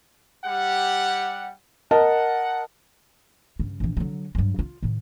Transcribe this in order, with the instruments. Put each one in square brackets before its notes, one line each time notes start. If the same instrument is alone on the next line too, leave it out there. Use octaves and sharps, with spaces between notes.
[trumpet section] G3 G4 F#5
[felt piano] A#4 D#5 A5 [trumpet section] F#5
[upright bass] G2 C#3
A#1 E3
D3 F#3
G2 F#3
F4
A2 D#3